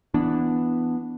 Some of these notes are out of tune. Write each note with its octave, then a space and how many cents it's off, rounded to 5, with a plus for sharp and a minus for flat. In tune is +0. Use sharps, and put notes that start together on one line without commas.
E3 +0 B3 +0 D4 +0